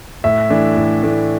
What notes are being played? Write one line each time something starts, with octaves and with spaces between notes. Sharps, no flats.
A2 E5
E3 A3 D4
A2
E3 A3 D4